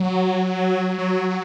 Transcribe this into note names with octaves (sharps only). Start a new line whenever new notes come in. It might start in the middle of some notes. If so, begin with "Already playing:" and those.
Already playing: F#3
F#3